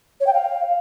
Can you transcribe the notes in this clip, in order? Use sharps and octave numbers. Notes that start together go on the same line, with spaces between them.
C#5
G5
F5